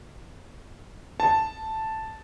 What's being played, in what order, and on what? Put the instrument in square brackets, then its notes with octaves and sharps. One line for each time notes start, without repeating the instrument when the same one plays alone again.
[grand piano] A5